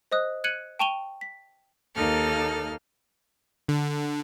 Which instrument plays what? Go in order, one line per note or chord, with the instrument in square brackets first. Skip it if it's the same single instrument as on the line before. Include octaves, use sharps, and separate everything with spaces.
[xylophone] C5 D#5 D#6 F#6
F#6 G#6 C#7 D#7 F#7
G5 A5 C#6 D#7 F7 G7
B6
[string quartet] D#2 A#3 D#4 A4 F6
[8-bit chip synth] D3